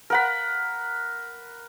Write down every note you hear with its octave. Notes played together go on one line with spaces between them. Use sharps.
A#4 F#5 B5